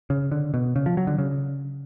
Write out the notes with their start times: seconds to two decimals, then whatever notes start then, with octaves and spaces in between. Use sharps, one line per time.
0.10 C#3
0.31 D3
0.54 B2
0.76 C#3
0.86 F3
0.97 F#3
1.07 D3
1.18 C#3